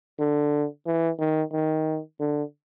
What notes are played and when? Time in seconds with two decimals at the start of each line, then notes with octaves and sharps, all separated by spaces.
0.19 D3
0.86 E3
1.19 D#3
1.53 D#3
2.20 D3